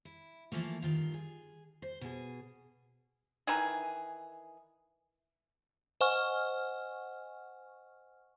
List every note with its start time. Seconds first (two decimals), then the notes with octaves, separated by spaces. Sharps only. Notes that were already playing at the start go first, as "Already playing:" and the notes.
0.05 E4
0.52 E3 F3 A3 A#3
0.82 G2 D#3 F4
1.14 G#4
1.82 C5
2.01 B2 G#4
3.47 D#3 E3 G#4
6.01 C5 D#5 F#5 G#5 C#6 F6